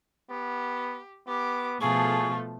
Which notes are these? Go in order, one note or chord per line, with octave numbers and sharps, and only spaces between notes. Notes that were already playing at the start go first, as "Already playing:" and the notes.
B3 G4
B3 G4 D6
B2 F3 A3 F4 G#4 A4 C#6